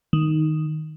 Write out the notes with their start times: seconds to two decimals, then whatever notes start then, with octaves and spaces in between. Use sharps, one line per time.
0.13 D#3